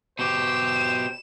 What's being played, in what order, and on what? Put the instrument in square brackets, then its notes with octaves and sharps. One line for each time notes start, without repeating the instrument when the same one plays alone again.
[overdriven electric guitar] B2 G4 [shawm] C5 [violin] E7